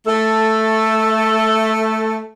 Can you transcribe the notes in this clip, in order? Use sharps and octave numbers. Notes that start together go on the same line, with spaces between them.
A3 A4